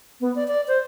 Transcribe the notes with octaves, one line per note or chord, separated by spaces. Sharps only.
B3
D5
D5
C5